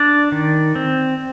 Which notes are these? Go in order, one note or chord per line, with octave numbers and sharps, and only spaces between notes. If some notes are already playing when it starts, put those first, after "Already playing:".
Already playing: D4 D5
D#3
C4